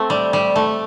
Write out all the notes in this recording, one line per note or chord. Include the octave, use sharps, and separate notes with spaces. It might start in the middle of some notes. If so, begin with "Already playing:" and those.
Already playing: A3 C4
G3
G3
A3